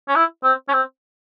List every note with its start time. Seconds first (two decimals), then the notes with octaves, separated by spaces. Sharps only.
0.08 C#4
0.16 E4
0.44 C4
0.69 C#4
0.73 C4